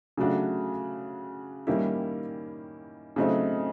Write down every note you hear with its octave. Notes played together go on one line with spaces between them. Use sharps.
C#3 F#3 A3 D4 F#4
D#3 G3 A#3 C#4 E4
C#3 F#3 A3 C4 D#4